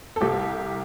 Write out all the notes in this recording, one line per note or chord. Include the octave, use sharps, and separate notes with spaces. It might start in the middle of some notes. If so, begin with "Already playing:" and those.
A4
C2 G4